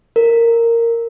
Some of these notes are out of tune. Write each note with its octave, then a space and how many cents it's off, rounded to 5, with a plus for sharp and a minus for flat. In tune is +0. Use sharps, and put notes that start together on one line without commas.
A#4 -10